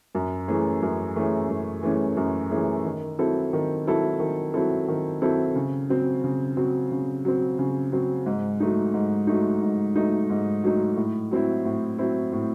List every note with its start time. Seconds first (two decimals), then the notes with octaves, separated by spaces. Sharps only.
0.15 F#2
0.48 E3 A3 C#4 G#4
0.82 F#2
1.15 E3 A3 C#4 G#4
1.49 F#2
1.83 E3 A3 C#4 G#4
2.17 F#2
2.51 E3 A3 C#4 G#4
2.85 D#3
3.19 F#3 C4 E4 A4
3.53 D#3
3.87 F#3 C4 E4 A4
4.20 D#3
4.54 F#3 C4 E4 A4
4.88 D#3
5.22 F#3 C4 E4 A4
5.55 C#3
5.89 F#3 C4
6.24 C#3
6.57 F#3 C4
6.91 C#3
7.25 F#3 C4
7.59 C#3
7.92 F#3 C4
8.26 G#2
8.60 F#3 A3 D#4
8.94 G#2
9.27 F#3 A3 D#4
9.62 G#2
9.95 F#3 A3 D#4
10.30 G#2
10.64 F#3 A3 D#4
10.96 A2
11.31 F#3 C4 E4
11.65 A2
11.98 F#3 C4 E4
12.32 A2